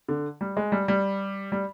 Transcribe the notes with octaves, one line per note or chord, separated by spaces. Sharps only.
D3
G3
G#3
G3
G3
G3